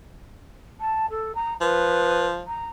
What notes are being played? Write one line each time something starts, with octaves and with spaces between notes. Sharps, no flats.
A5
A4
A#5
F3 B4
A#5